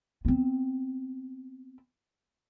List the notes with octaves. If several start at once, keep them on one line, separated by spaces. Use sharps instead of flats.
B3 C4